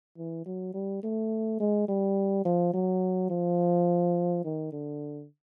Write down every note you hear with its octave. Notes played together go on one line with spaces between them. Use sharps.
E3
F#3
G3
A3
G#3
G3
F3
F#3
F3
D#3
D3